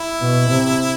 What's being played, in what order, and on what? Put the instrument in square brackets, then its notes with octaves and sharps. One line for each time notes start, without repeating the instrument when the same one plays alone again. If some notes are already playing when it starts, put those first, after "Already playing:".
Already playing: [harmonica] E4
[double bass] B2
C3